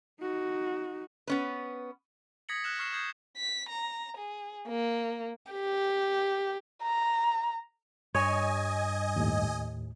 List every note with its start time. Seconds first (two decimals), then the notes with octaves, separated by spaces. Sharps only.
0.20 D#4 F#4
1.27 B3 C#4 B4
2.49 D#6 G#6 A#6 B6 C#7 F#7
2.64 F6 F#6 E7 F#7
2.79 C#6 F6 C7 E7
2.92 D#6 G6 G#6 C7
3.37 B6
3.69 A#5
4.17 G#4
4.68 A#3
5.52 G4
6.83 A#5
8.14 G2 C#5 D#5 G#5
9.16 D#2 A2